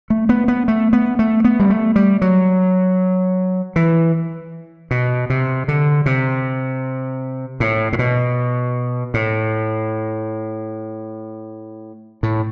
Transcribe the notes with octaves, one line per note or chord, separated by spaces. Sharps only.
A3
B3
B3
A3
B3
A3
B3
G3
A3
G3
F#3
E3
B2
C3
D3
C3
A2
A2
B2
A2
A2